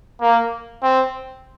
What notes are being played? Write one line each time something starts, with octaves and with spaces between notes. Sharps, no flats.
A#3
C4